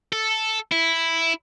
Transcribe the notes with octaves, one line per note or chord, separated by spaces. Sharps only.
A4
E4